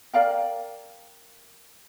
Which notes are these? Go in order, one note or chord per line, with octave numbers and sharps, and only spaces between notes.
A#4 D5 F5 G5